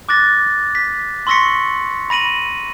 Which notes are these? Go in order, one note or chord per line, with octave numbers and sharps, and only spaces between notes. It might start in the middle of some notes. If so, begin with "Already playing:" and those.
D6 F#6 A6 A#6
B6
C6 C#6 E6 A#6 B6 C#7
B5 A#6 D#7 F#7